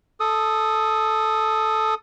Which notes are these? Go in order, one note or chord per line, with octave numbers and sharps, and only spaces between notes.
A4 D#6